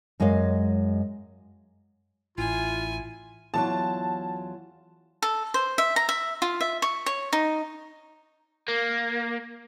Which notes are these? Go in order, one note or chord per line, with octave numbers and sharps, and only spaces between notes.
F#2 G#3 C#5 D#5 F5
A1 E4 F4 G#5
E2 F#3 F4 A5
A4
C5
E5
A#5
E5
F4
E5
C#6
C#5
D#4
A#3